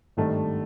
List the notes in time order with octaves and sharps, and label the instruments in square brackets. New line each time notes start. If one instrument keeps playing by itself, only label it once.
[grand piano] G#1 G2 D#3 A3